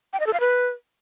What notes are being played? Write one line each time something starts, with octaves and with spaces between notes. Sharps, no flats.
G5
D#5
A4
F5
B4